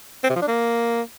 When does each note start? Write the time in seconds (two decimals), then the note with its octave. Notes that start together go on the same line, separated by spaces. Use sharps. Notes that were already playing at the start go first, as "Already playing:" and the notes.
0.23 C4
0.29 C3
0.35 F3
0.41 D4
0.47 A#3